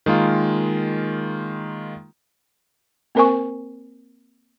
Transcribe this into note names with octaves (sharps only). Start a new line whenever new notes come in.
D#3 G#3 A#3 F4
A#3 C4 A#4 C5 G#5 C#6